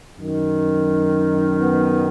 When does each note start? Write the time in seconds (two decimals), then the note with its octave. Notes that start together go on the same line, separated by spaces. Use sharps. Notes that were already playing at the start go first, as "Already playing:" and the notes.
0.18 F#2 D#3
1.60 B3